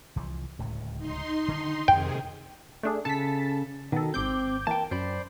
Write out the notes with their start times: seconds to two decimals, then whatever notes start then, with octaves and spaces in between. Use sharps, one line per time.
0.16 C2 E3 F3
0.59 D1 C#2 A2
0.98 D#4 C6
1.48 D3 D#3 D4
1.88 F2 C3 D#3 G#4 G5
2.83 A3 D4 G#4
3.05 C#3 A4 A5 B6
3.92 B2 D#3 A4
4.14 G#1 C4 D6 G6
4.67 E3 A#3 G5 A5
4.91 F#2 C5 D5 B5